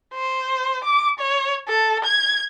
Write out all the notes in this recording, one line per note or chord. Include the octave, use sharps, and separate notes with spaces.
C5
D6
C#5
A4
G#6